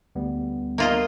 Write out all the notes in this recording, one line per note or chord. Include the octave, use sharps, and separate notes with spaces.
D2 G3 B3
A#3 F4 D#5